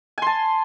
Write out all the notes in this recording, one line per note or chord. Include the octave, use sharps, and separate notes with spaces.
G#5 A5 C6